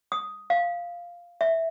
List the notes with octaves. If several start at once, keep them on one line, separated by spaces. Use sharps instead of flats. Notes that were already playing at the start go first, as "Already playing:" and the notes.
D#6
F5
E5